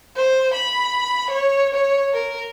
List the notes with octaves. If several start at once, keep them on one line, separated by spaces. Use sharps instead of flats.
C5
B5
C#5
C#5
A#4